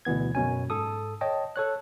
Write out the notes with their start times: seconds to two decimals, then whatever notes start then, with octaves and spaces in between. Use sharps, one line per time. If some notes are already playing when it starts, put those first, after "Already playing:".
0.05 D2 B2 E3 B3 G#6
0.35 F#2 B2 C#4 G#5
0.70 G#2 A4 D#6
1.21 C#5 D#5 G5 A5
1.56 A4 C#5 F#6